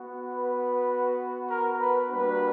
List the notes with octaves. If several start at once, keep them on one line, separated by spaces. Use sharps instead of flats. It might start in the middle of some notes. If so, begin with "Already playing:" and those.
Already playing: B3 F#4
B4
A#4
B4
G3 A#3 D4 F#4 B4